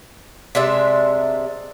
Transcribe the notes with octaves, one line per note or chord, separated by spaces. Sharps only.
C3 G#3 D4 E5